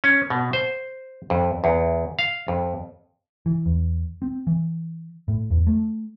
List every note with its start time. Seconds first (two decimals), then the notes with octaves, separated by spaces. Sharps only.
0.04 C#4
0.30 B2
0.53 C5
1.30 F2
1.64 E2
2.19 F5
2.48 F2
3.46 E3
3.66 E2
4.22 C4
4.47 E3
5.28 A2
5.50 E2
5.67 A3